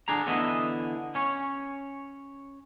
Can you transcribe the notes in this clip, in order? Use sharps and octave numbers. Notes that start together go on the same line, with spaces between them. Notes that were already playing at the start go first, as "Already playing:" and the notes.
D3 D4 G#4 A#5
D3 E3 B3 E4 D#5
C#4 C#5